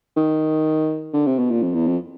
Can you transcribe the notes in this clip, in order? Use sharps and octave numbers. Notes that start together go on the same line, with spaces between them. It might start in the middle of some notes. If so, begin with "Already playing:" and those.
D#3
D3
C3
B2
A#2
F2
E2
F2